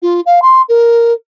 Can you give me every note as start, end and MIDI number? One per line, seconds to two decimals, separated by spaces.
0.02 0.21 65
0.26 0.40 77
0.42 0.62 84
0.69 1.13 70